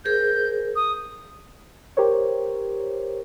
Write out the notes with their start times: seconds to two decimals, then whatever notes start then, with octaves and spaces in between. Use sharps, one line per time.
0.05 G#4 A#4 C5 G6
0.76 D#6
1.97 G4 A#4 C5 C#5